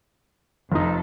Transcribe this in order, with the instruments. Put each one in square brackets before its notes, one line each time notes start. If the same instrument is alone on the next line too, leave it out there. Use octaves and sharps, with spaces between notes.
[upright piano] F1 D#4 [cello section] F2 A4